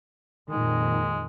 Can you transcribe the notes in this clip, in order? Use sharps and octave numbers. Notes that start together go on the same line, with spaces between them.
F2 A#2 D#3 G#3